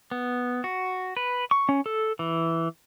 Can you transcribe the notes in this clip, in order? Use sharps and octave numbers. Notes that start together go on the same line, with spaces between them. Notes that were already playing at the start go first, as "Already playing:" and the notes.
B3
F#4
B4
C#6
C#4
A4
E3